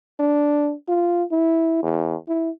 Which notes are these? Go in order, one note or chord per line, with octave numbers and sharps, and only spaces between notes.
D4
F4
E4
E2
E4